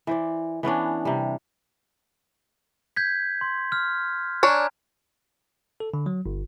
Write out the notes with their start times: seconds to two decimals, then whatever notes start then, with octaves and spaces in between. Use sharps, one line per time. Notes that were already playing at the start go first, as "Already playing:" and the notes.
0.07 E3 C5 D5
0.63 E3 B3 C#4 D4
1.05 C3 G3
2.96 G6 G#6 B6
3.41 C6
3.72 F6
4.43 D4 C#5 G#5 A#5
5.80 A4
5.94 D3
6.06 F#3
6.26 G1